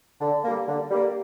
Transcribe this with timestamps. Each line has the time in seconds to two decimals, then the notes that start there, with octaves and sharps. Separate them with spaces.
0.21 D3
0.44 G3 A#3
0.68 D3
0.90 G3 A#3